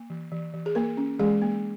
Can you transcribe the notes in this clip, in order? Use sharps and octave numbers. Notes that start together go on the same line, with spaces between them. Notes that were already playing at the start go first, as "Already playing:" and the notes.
Already playing: A#3
E3
E3
E3
G#4
A#3 A#4
C#4
E3 G#3 G#4
A#3